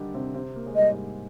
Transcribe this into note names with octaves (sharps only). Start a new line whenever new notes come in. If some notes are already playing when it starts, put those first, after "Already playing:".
Already playing: D3 D#3 G3 D4 D#4 G4
C3 C4
C3 C4
A#3
G#3
G3 D#5
G#2 G#3